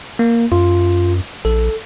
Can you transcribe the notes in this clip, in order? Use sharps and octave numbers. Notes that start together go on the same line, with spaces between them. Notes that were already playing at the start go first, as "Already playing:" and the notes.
A#3
F#2 F4
A#1 A4